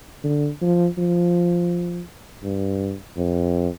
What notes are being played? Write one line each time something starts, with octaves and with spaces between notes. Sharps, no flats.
D3
F3
F3
G2
F2